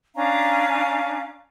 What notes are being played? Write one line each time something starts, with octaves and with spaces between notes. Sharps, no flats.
C#4 D4 F5 A#5